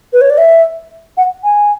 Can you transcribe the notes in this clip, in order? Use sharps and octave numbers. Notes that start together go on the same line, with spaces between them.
B4
C#5
D5
E5
F#5
G#5